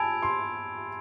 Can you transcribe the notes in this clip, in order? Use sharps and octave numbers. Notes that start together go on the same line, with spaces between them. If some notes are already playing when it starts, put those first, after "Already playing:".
Already playing: G#5 A5 B5 E6 G#6 D7 F7
C6